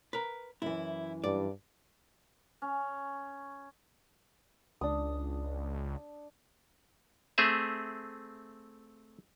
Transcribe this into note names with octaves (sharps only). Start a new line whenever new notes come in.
A#4 B4
F#2 E3 E4
G2 D5
C#4
C#2 D4 D#6
A3 C4 G#4 E5